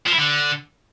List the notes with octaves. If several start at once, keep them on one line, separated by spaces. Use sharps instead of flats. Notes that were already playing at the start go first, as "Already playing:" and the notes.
F3
E4
D3